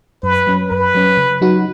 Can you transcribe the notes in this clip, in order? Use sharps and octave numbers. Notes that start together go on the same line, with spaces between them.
F#2 B4
F#3 C#4
F#2 B4
F#3 C#4
C#3
F#3 D#4 F#4